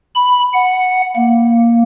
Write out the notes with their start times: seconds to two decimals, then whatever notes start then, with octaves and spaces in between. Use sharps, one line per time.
0.15 B5
0.54 F#5
1.15 A#3